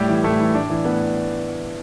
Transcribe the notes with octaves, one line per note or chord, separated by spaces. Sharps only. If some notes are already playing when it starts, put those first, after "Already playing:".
Already playing: A2 G3 G4
E3
A2 A3 A4
E3
A2 D4 D5
E3
A2 B3 B4